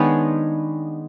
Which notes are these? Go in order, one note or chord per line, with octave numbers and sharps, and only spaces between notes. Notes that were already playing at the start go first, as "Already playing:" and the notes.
Already playing: D#3 G#3 B3 D4 C#5